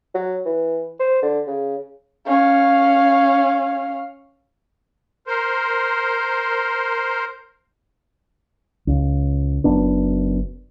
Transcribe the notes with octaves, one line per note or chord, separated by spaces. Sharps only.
F#3
E3
C5
D3
C#3
C#4 F5
A#4 C5
C#2
F#1 F#2 B3 D4